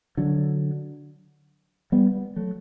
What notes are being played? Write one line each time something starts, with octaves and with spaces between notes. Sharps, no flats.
D3 F#3
G3 B3
F#3 A3